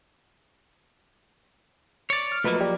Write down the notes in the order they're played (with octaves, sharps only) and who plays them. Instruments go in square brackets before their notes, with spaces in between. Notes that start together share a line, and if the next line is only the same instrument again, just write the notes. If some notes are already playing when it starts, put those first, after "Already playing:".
[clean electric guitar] C#5 D5
[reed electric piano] F6
[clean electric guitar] F3 F#3 A#3 [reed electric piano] A3 B4 D#5
[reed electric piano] G4 D5